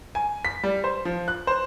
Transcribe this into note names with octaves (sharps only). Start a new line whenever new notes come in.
G#5
B6
G3
C5
F3
F#6
C5